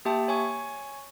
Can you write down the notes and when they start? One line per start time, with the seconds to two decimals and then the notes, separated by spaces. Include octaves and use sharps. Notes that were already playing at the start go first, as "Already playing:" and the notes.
0.05 A#3 G4 E5 G5 A5
0.28 C#5 G#5 C#6